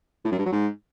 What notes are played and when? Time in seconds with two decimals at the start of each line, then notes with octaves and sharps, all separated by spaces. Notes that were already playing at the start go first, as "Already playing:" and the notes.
0.25 A2
0.32 F#2
0.39 G2
0.46 F#3
0.53 G#2